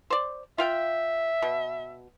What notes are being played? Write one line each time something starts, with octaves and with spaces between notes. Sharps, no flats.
C5 D5
F4 E5 F5 G5
B2